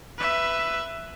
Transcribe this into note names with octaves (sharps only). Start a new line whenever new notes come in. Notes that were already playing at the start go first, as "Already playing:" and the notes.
B4 E5